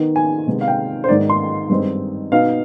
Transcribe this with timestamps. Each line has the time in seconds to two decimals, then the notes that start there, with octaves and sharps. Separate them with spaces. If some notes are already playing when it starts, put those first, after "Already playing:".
Already playing: D#3 B3 D#4
0.16 G#5
0.47 C3 D#3 G#3 B3
0.61 F5
0.68 G5
1.04 C5
1.08 G#2 D#3 B3 D#4 D5
1.30 C6
1.69 G2 D#3 G#3 C4 D#4
2.32 B2 B3 D#4 F5